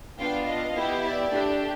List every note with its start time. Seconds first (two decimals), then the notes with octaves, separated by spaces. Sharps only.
0.18 B3 D4 F4 F5 G5
0.46 D#5 F5
0.75 B3 E4 G4
1.03 D5 E5
1.31 A3 D4 G4